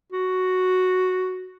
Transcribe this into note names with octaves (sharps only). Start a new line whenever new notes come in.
F#4